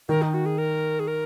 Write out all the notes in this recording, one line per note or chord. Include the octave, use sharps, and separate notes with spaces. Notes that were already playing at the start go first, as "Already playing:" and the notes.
D#3 A#4
D#4
F#4
G#4
A#4
G#4
A#4